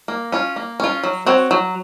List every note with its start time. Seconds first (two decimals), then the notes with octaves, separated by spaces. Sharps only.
0.08 A#3
0.32 C#4 F4
0.56 A#3
0.80 C#4 F4
1.04 F#3
1.26 C4 F#4 C#5
1.51 F#3